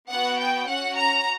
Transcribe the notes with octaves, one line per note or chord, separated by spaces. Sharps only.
B3 F#4 F#5
G5
C#4 F#4 F#5
A#5